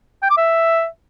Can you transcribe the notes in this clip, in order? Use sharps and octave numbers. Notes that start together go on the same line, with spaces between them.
G5
D6
E5